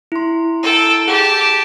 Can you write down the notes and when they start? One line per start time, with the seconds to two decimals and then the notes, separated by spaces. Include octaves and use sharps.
0.12 E4 C6
0.63 A4 G5
1.08 G4 G#4 A5